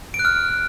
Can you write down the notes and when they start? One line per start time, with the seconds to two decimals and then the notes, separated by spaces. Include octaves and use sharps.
0.14 D7
0.19 F#6
0.25 F6